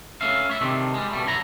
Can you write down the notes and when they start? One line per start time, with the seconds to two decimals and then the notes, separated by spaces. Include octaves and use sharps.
0.21 A3 C#4 E5 F5
0.49 C#5 E5
0.61 C3 D#3 A3 C4 D4
0.94 G3 G#3
1.11 B2 G3 A3
1.26 F#2 D3 E4 A#5